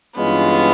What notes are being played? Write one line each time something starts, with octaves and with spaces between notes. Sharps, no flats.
G2 E3 G#3 B3 C#4 F4